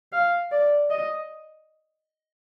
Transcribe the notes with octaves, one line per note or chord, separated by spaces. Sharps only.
F5
D5
D#5